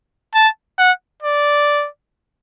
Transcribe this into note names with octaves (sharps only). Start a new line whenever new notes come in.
A5
F#5
D5